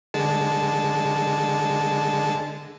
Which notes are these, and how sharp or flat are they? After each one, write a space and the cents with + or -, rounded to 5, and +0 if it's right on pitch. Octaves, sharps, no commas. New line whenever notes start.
D3 +0 G#3 -10 A5 -15